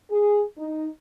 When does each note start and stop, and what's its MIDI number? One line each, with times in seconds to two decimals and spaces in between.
0.11 0.42 68
0.58 0.87 63